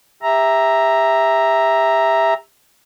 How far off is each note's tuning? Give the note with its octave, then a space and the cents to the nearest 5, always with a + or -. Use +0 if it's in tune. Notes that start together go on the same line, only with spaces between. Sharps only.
G4 +30 E5 +0 A#5 +0